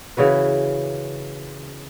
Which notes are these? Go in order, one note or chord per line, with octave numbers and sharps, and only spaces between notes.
C#3 E3 F#4 B4